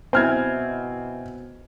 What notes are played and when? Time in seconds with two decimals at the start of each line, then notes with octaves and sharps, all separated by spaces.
0.13 B2 C4 E4 G#5 F6 G#6